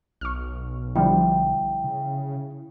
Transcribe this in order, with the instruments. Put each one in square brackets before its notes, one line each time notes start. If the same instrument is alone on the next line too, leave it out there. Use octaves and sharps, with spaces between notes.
[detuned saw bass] B1 [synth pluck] C#6 F6
[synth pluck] D3 F3 G3 [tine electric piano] E4 [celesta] G5
[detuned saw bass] C#3